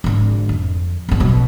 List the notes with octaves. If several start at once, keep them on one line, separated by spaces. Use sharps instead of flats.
G#1 D3
F2
G#1 F3
B1 B2